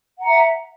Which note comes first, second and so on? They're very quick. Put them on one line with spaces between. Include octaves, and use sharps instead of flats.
F#5 A#5 E5